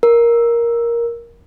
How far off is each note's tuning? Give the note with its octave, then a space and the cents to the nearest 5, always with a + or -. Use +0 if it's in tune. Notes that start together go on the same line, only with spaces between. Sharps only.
A#4 +10